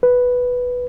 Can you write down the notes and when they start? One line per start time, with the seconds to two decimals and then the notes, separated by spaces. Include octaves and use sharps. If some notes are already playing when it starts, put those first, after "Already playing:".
0.03 B4